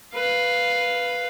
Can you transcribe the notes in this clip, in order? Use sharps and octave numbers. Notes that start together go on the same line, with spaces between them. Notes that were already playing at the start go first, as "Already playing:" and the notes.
B4 F5